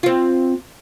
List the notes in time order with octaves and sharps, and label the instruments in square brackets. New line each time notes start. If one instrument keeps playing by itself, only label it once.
[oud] C4 F4